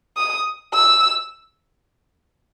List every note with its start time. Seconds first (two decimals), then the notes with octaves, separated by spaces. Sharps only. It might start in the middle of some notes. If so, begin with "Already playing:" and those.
0.17 D#6
0.74 E6